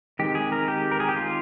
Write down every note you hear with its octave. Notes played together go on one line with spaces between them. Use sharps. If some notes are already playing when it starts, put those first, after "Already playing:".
D#3 G#3 C4 G4
G#4
A#4
G4
A#4
G#4
G4
F4